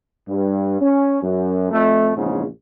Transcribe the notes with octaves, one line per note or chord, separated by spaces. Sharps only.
G2
C#4
F#2
F2 A3
A#1 E2 G#2 C#3